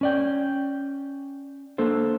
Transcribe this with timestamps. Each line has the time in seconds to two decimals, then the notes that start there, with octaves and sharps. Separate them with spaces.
0.01 C#4 D5 G5
1.78 A#3 D4 A4 C5